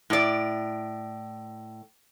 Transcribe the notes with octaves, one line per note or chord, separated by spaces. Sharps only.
A2 D5